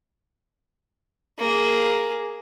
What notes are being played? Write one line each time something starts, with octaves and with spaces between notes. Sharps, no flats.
A#3 G#4